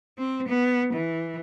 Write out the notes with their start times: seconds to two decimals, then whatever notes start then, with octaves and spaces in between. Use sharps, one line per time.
0.18 C4
0.48 B3
0.93 E3